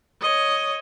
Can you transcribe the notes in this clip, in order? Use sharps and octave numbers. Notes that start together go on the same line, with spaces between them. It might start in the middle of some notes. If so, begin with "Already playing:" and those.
C#5 D#5